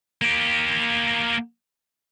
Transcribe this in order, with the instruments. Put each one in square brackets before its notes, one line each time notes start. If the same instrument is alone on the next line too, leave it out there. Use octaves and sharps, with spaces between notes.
[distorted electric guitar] A#3 G4